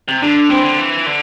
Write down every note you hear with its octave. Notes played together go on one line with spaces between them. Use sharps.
C3
D3 D4
E3 C4
D3
E3
D3